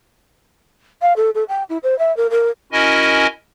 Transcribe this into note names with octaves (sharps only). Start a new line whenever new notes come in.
F5
A4
A4
G5
E4
C5
E5
A#4
A#4
C#4 E4 F#4 A#4 D#5 G#5